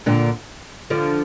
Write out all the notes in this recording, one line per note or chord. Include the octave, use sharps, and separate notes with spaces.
A#2 D3
D3 F3